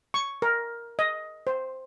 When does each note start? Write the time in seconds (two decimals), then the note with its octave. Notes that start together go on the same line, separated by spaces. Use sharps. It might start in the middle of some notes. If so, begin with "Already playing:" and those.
0.14 C#6
0.42 A#4
0.99 D#5
1.47 C5